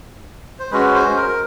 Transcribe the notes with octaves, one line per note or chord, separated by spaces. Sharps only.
C5
G#3 C#4 F#4 B4
C5
A#4